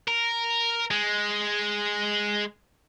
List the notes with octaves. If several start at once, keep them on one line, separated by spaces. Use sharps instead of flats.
A#4
G#3